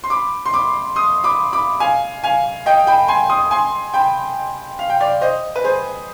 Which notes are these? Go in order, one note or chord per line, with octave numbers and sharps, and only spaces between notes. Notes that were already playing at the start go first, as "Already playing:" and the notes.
C6
B5 D6
C6
B5 D6
C6 D#6
B5 D6
B5 D6
F5 G#5
F5 G#5
D#5 G5
G5 B5
G#5 C6
C6 D#6
G#5 C6
G5 B5
F5
G5
D5 F5
C5 D#5
B4
G#4 C5